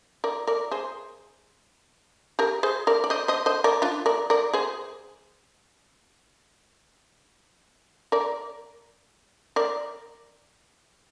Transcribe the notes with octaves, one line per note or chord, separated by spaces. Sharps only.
A#4 D5
A#4 D5
G#4 C5
G4 A#4
G#4 C5
A#4 D5
D5
C5 D#5
C5 D#5
C5 D#5
A#4 D5
D4 F4
A#4 D5
A#4 D5
G#4 C5
A#4 D5
A#4 D5